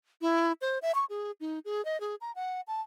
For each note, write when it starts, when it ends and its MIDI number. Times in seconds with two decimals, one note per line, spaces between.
0.22 0.53 64
0.61 0.79 72
0.82 0.92 76
0.95 1.05 85
1.09 1.31 68
1.41 1.59 63
1.65 1.84 68
1.85 2.00 75
2.00 2.15 68
2.21 2.32 82
2.36 2.61 78
2.68 2.81 81